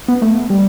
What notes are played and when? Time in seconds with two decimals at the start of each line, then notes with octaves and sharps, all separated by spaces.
0.08 B3
0.22 A3
0.50 G3